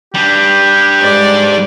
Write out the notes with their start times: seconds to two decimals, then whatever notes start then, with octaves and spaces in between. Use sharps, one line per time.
0.14 G3 D4 G4
1.02 G#2 D5